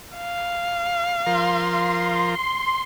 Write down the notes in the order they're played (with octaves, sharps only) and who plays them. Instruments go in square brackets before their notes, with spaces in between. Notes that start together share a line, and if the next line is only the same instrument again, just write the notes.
[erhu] F5
[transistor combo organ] F3 A#4 [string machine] C6